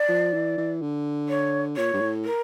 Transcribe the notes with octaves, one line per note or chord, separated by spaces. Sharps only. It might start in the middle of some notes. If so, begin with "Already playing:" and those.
Already playing: D5
F3
E3
E3
D3
C#5
A#2 C#5
G2
A2
A#4